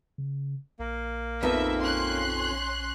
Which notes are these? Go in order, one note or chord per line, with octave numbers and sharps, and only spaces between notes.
C#3
A#1 A#3
F2 B3 D#4 E5
C#4 C6 F#6